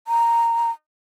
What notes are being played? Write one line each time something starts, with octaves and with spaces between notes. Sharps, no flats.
A#5